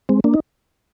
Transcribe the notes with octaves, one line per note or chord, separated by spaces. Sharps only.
G#3 C4
A#3 D4
D#4